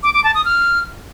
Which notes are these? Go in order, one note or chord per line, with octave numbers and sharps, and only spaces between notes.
D6
D6
A5
D#6
F6